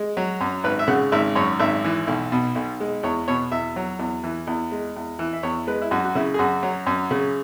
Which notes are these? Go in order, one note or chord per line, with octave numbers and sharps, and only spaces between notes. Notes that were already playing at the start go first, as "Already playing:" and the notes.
Already playing: G#3
F#3
F#2
G#1 B4
E5
C#3 F#5
G#1 E5
F#2 C#5
G#1 E5
E3
B1
B2
B1
G#3
E2 C#5
B2 C#5
E2 E5
F#3
E2
E3
E2
G#3
E2
E3
E5
E2 C#5
G#3 B4
E4
F#2 F#4
F#4
C#3 E4
G#4
F#2 F#4
F#3
F#2
C#3